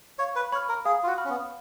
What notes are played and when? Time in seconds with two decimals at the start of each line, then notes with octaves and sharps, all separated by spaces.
0.19 C#5 F5
0.36 B4
0.52 C#5 B5 F6
0.69 A#4
0.85 G#4 F5
1.03 F4
1.07 F#4
1.18 B5 F6
1.25 C#4
1.30 B3